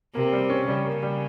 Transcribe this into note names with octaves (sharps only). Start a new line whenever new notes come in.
C3 A#3
G3
C#4
C#3 G3
A#3
G3